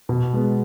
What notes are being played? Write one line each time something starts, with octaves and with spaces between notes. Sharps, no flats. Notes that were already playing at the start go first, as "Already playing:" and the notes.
B2
G#3 B3